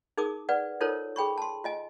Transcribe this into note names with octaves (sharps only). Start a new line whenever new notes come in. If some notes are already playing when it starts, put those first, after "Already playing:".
D#4 G#4 A#4 D6 D#6
B4 D5 F#5
D#4 F4 A4 A#4 C5 C#5
G#4 G5 B5 C#6
A5 C6
F4 D#5 G#5